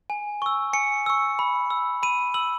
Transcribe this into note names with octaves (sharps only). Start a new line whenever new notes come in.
G#5
C#6 E6
G#5 C#7
C#6 E6
B5
E6
B5 D#7
E6 F#7